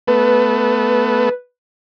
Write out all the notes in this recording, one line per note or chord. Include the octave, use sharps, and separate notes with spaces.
A3 B3 B4